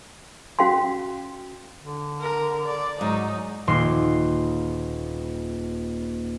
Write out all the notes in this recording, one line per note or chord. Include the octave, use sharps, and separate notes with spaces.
C#4 F#4 F5 G5 C6
D3
A#4
D5
G#2 F#3 D#4
D#1 C6